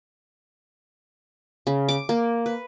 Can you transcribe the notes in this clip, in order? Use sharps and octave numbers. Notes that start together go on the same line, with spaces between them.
C#3
D6
A#3
B4